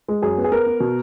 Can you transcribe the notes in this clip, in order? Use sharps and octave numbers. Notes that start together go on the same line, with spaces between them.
G#3
F#2 G#4
B3
G#4
B3 A#4
B3
B2